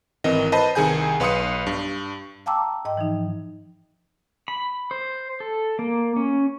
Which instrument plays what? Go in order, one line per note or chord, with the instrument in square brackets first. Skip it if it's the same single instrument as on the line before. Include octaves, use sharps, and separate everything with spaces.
[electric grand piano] G#1 E3 C4 A#4 D#5
B4 C5 D#5 A5 B5
C2 D#3 G#4 G#5 G6
B1 B4 F5 C6 D#6 C#7
G2
[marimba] F5 G5 A5 A#5 D6 E6
G#2 D#5 G5
E3 F3 D#4
[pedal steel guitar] B5
C5
A4
A#3
C#4